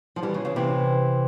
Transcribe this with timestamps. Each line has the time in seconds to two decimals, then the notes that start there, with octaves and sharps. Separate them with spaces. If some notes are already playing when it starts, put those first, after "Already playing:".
0.16 F3
0.23 E3 G3
0.34 C#3
0.45 C#3
0.56 C3 E3